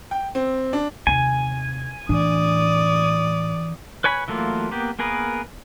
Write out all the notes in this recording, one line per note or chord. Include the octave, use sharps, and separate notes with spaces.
G5
C4
D4
D#2 C3 G#5
A2 E3 D4 D5 D#6
B4 C#5 G#5 B5
E3 F#3 A3 A#3 F4
A#3 B3 G4
A#3 B3 G#4 A#4 B4